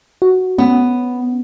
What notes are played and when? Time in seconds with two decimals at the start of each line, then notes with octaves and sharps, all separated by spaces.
0.22 F#4
0.58 B3 C#4